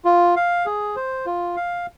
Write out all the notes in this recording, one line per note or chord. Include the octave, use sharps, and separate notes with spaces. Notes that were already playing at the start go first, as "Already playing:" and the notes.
F4
F5
G#4
C5
F4
F5